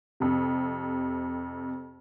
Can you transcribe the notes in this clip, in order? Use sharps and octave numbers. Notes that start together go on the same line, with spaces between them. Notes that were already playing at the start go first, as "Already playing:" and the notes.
F2 C3